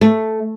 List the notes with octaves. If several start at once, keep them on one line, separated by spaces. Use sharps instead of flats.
A3